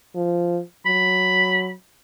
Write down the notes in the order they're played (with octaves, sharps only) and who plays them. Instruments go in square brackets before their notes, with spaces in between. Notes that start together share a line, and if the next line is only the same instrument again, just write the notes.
[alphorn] F3
[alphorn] F#3 [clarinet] B5